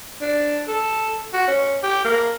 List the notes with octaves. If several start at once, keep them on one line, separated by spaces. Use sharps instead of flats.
D4
A4
F#4
C#4
G4
A#3